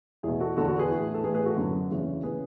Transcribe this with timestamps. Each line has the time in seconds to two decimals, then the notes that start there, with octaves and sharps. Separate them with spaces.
0.23 E2 B2 E4 G#4
0.40 F#4 A4
0.57 E2 D3 F#4 A4
0.68 F#4 A4
0.79 G#4 B4
0.90 A2 E3
1.14 A4
1.24 A2 E3 G#4 B4
1.34 G#4 B4
1.46 F#4 A4
1.57 F#2 D3
1.90 E2 C#3 E3
2.23 C#3 E3 G#4 B4